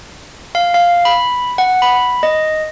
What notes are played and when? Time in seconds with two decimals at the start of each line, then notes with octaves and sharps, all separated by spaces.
0.55 F5
0.74 F5
1.05 B5
1.58 F#5
1.82 B5
2.23 D#5